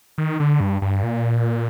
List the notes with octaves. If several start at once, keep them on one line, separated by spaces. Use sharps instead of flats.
D#3
D3
G2
G2
A#2